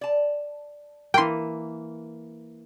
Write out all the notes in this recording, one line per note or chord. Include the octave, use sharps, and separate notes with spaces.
D5 A5
E3 A#3 G5 C6